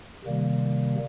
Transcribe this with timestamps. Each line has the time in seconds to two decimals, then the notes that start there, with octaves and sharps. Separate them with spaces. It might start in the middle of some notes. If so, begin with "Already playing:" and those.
0.25 C3 D#3 G3 A#3